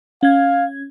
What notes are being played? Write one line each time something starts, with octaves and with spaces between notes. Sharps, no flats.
C#4 F5 G#6